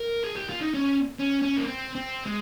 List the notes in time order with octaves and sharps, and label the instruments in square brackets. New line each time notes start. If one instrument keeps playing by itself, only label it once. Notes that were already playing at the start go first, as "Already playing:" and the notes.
Already playing: [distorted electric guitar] A#4
G#4
G4
F4
D#4
C#4
C#4
C#4
A#3
C4
C4
G#3